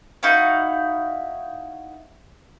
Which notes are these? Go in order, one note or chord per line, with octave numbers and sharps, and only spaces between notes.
D#4 E4 F#4 F5